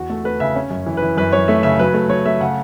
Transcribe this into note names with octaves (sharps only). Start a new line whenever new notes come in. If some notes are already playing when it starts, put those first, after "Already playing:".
Already playing: E2 F#4
A3 A4
A3 B4
C#3 E5
C#4
F#2
E3
E3 B4
F#2 B4
F#2 C#5
A3 E5
C#3 E5
F#3 B4
A3
F#3 C#5
A3 E5
C#3 F#5